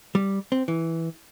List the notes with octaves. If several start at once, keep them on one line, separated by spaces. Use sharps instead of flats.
G3
C4
E3